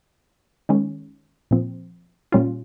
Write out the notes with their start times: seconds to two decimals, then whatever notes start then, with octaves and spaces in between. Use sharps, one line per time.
0.69 D#3 G#3 C#4
1.51 A#2 F3 C4
2.32 A#2 G3 C#4 F4